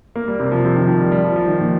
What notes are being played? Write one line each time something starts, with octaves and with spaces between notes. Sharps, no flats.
A#3
G3
C3
F3
C3
D#3
F3
G3
G3
F3
F3
D#3
A#2